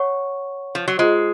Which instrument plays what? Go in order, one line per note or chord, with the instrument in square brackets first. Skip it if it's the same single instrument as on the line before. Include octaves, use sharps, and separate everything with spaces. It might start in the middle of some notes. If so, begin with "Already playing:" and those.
Already playing: [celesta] C#5 F#5 C#6
[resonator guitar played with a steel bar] F3
F#3
[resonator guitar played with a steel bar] G#3 [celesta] F4 G#4 C5